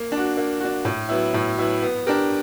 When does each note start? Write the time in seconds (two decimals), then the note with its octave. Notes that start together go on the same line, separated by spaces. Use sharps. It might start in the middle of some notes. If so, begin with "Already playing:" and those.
Already playing: A#3
0.12 D4
0.17 F#4
0.37 A#3
0.60 D4 F#4
0.85 A2
1.09 F#3 B3 E4
1.34 A2
1.57 F#3 B3 E4
1.81 B3
2.07 D4 G4 A#4